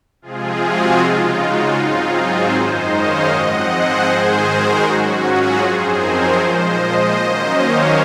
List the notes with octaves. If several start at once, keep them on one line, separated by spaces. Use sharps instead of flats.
C3 F3 G#3 C4 F4 G#4
F#4
C#3 G#3 D#4 F4
F#4
G#2 F#3 C4 D#4 F4 G#4
G#4 C5
F#2 D#3 G#3 D#4 C5 D#5
C#5 F5
G#2 F3 C4 D#5 F#5
G#4 C5
G#2 D#3 G#3
F#4 A#4
G#2 F#3 C#4 F#4
F4 G#4
F#2 F3 C4 D#4 G#4 C5
A#4 C#5
A#2 F3 G#3 C5 D#5
D#3 F#3 A#3 C#4
C#5 F5